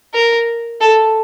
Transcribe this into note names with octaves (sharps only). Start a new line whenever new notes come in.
A#4
A4